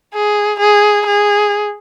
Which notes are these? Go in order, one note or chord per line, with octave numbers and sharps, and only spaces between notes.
G#4
G#4
G#4